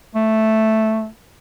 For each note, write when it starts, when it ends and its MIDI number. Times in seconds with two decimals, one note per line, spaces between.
0.15 1.07 57